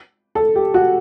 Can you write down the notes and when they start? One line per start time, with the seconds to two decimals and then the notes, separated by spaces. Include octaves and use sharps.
0.35 A4
0.55 G4
0.74 F#4